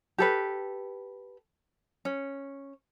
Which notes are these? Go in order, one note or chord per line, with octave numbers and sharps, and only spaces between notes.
G4 A4 B4
C#4